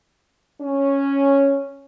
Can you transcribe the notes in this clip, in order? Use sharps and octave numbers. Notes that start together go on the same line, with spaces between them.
C#4